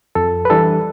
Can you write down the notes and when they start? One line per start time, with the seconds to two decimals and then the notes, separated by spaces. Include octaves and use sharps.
0.15 F2 A4
0.45 B4
0.50 E3 G3 D4 A4